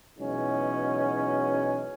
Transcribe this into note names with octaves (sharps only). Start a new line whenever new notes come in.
B2 E3 F#3 G#3 C#4 D#4